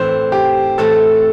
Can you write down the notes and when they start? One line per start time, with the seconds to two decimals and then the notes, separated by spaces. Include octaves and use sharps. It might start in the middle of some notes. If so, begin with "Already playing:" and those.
Already playing: A2 E3 C4 E4 C5
0.32 G4
0.78 A2 E3 A3 C4 A4